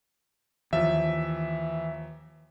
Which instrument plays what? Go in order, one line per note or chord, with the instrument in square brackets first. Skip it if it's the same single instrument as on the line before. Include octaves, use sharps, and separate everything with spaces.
[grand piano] D#2 F3 [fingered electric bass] E3 [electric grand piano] E5